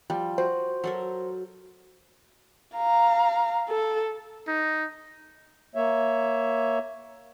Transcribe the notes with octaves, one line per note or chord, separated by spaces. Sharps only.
F3 G3
F#4 C5
F#3 A4 A#4
F5 A#5
A4
D#4
A#3 C#5 E5